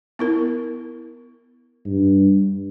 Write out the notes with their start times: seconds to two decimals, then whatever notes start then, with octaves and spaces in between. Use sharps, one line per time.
0.19 B3 E4 A#4
1.86 G2